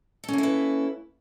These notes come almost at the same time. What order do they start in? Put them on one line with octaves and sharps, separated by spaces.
A4 C#4 A#3 E4 B4